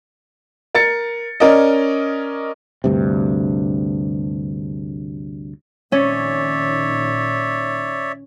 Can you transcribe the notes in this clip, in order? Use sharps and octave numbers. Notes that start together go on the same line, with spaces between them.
A#4 A6 C#7
C#4 A#4 D5 D#5
D2 G2 C3
A#1 A#2 D#3 C#4 C#5 D5 E5